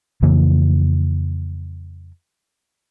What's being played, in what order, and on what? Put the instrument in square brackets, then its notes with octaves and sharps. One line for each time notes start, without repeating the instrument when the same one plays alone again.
[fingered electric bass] F2 C#3 E3 A#3